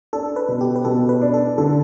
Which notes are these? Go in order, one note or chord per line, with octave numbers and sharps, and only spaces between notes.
D4 A4
B4
B2
G4
B4
B2 A4
B4
D4
A4
D3 A4